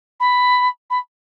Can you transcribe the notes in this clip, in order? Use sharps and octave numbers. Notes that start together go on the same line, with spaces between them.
B5
B5